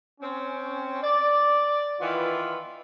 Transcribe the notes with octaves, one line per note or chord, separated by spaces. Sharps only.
C4 C#4
D5
D#3 E3 B3 F4